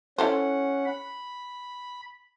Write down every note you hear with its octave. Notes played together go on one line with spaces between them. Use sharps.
C#4 E4 A4 C5 F#5
B5